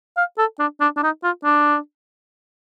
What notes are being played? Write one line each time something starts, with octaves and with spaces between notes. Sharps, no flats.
F5
A4
D4
D4
D4
D#4
F4
D4